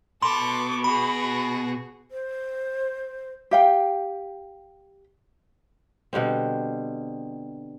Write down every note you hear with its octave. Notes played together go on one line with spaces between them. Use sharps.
B2 A4 C6 D6
F#4 G#4 B5
C5
G4 F5 G5
B2 D3 G3 C4